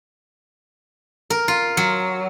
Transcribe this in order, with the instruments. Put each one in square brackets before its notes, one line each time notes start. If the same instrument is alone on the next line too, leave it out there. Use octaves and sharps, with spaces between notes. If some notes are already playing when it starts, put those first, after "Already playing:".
[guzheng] A#4
F4
F#3